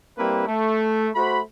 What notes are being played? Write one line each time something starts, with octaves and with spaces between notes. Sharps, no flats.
G3 A#3 C4 E4 B4
A3
A3 F#4 C5 B5